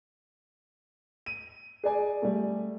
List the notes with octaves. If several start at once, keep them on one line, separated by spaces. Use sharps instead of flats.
D#7
G#4 D5 G#5
G3 A3